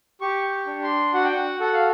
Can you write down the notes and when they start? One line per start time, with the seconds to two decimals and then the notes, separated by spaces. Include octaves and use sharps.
0.21 G4 C#6
0.51 C#6
0.67 D4
0.83 C6
1.14 F#4 F#5
1.24 G5
1.33 F#5
1.60 A4 F#5
1.73 F5